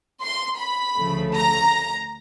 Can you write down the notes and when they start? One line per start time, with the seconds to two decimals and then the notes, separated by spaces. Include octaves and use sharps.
0.22 C6
0.59 B5
0.98 D2 C#3 F3 A3
1.36 A#5